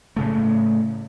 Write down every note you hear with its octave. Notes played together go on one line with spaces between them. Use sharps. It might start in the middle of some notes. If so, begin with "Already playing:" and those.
A2 C#3 A3